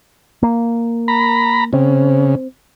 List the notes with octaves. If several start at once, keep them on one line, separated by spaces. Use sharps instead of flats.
A#3
A#5 B5
C#3 C4